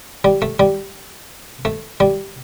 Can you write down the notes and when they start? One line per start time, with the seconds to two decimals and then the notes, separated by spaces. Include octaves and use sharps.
0.24 G3
0.42 A3
0.59 G3
1.65 A3
2.00 G3